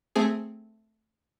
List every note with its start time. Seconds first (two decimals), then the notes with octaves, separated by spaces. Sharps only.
0.16 A3 C4 G#4